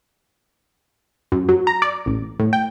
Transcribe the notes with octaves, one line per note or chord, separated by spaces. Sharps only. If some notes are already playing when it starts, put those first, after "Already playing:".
F#2
F#3
A#5
D5
A1
A2
G5